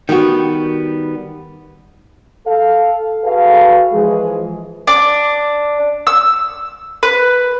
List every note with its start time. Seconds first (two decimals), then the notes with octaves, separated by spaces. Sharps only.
0.09 D#3 G3 B3 F#4
2.47 A4 F5
3.25 F#4 G#4 A4 B4 F5
3.93 E3 F3 G#3 G#4
4.87 D4
6.07 E6
7.03 B4